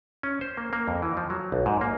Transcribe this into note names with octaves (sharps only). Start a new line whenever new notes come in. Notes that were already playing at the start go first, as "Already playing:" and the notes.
C#4
C5
A#3
A#3
F2
E3
F3
F#3
B1
G#2
A#3